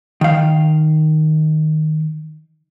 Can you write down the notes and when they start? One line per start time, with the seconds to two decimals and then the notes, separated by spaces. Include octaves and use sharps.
0.21 D#3 F5